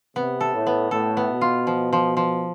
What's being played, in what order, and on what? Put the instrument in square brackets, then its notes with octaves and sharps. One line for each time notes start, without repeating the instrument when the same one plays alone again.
[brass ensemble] C3 [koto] B3
[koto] A4
[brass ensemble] A2
[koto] B3
[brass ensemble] A2 [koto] A4
[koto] B3
[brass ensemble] B2
[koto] F4
F3
F3
F3